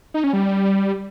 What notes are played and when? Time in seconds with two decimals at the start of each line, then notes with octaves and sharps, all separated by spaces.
0.14 D#4
0.24 C#4
0.33 G3